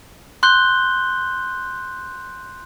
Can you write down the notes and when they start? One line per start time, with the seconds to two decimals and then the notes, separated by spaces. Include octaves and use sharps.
0.43 C6 F#6 G6 G7